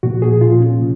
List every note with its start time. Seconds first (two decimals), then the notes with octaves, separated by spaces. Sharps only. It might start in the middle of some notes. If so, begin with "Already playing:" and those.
0.03 A#2 F3 A#3 F#4
0.22 G#4
0.41 F4
0.60 C#4
0.79 C3 F3 A#3